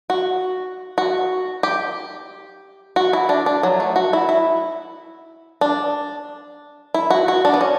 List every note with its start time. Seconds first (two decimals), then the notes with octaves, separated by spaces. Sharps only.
0.10 F#4
0.98 F#4
1.63 G4
2.96 F#4
3.13 E4
3.29 D4
3.46 D4
3.63 F#3
3.80 A3
3.96 F#4
4.13 E4
4.29 E4
5.61 D4
6.94 E4
7.10 F#4
7.28 F#4
7.45 D4
7.54 B3
7.61 C#4